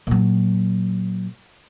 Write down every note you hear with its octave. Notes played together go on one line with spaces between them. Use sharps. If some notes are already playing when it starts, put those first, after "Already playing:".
A#2 F#3